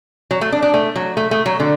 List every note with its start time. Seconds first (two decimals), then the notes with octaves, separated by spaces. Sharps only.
0.31 F#3
0.41 A3
0.52 D4
0.63 D4
0.74 A3
0.96 F#3
1.17 A3
1.31 A3
1.46 F#3
1.60 D3